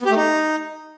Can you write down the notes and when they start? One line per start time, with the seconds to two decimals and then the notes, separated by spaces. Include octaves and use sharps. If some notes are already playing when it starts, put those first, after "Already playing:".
0.01 B3
0.06 G4
0.11 A3
0.16 D#4